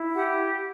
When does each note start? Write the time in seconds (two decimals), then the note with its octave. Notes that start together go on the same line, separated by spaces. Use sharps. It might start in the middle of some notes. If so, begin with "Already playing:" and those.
Already playing: E4
0.15 G4 F#5